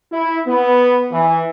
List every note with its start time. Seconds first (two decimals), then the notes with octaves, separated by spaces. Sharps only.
0.12 E4
0.47 B3
1.12 E3